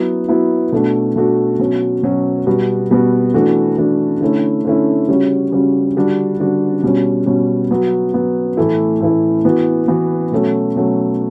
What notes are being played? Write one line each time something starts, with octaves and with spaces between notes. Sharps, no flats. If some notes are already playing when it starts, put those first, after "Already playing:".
Already playing: F#3 B3 E4
F#3 B3 E4
B2 A3 D4 F#4
B2 A3 D4 F#4
B2 F#3 C#4 F#4
B2 F#3 C#4 F#4
B2 G3 B3 F#4
B2 G3 B3 F#4
E3 A3 D4 F#4
E3 A3 D4 F#4
D3 A3 C#4 E4
D3 A3 C#4 E4
C#3 G3 C#4 F#4
C#3 G3 C#4 F#4
D3 G3 D4 F#4
D3 G3 D4 F#4
B2 G3 C#4
B2 G3 C#4
F#3 B3 F#4
F#3 B3 F#4
A2 E3 A3 E4
A2 E3 A3 E4
E3 B3 F#4
E3 B3 F#4
B2 F#3 A3 C#4 F#4
B2 F#3 A3 C#4 F#4